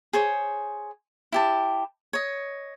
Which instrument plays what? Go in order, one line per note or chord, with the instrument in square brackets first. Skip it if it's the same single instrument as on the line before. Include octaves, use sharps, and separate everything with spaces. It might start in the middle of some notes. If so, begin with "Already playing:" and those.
[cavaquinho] G#4 C5 C#5
E4 G4 A5
C#5 D#5